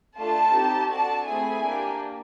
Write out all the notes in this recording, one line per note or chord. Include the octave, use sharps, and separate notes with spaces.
A3 D4 F4 A4 A5
C4 D#4 G4
D4 F#4 A4 A5
A3 C4 E4 G#4 G#5
A#3 D4 G4